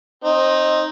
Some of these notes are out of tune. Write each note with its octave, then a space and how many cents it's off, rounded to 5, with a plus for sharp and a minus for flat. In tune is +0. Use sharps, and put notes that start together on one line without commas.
C4 +25 D#4 +0